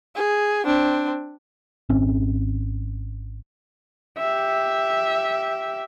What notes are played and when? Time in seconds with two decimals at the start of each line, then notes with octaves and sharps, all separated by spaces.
0.16 G#4
0.65 C4 D4
1.89 G#1 C4 C#4
4.18 G4 E5